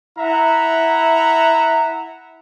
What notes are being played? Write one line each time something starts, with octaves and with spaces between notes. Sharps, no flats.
E4 E5 F#5 A#5